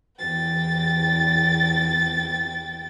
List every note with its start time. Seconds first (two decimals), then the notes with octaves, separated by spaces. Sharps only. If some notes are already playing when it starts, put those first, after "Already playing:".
0.19 E2 G5 A6